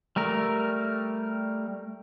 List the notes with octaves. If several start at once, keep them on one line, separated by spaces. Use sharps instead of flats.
G3 A3 A#4